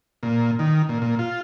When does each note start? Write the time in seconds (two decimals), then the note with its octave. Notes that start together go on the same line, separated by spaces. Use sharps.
0.23 A#2
0.59 D#3
0.89 A#2
1.02 A#2
1.19 F4